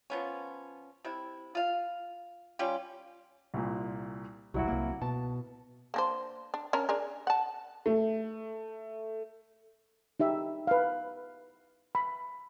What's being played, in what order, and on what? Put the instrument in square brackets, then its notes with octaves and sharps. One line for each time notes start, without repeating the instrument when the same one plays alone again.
[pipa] F3 B3 C#4
C3 E4
F4 F5
G3 C#4 F4 G4
[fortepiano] C2 A#2
[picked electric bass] D#1 C2 [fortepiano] F#3 E4 F#4
[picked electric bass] C2 A#3
[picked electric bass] B2 [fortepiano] A5
[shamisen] A#3 D4 C5
D4
C#4 D4 A#4
D4 G#4 A#4
F#5 A5
[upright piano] A3
[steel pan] D#4 G4 E5
B4 F5
B5